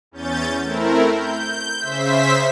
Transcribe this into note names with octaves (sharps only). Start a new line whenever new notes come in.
E2 C#4 G6 A6
A3 C4 E4 A#4
G6
C#3 C5 E5 B6